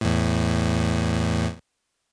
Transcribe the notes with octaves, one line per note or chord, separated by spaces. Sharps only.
E2 A2